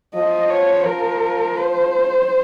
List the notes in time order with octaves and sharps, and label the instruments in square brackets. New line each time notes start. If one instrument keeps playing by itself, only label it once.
[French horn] F3 [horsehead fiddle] D#5
[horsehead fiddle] C#5
[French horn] F3 [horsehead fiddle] A#4
[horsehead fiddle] C5